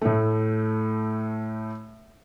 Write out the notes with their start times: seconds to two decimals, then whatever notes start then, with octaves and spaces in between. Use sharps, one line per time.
0.01 A2 A3